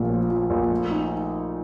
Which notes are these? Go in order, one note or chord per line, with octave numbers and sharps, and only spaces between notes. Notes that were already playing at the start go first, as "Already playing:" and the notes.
Already playing: A#1 A#2 A3
F3
F3
A#1
A3
D#4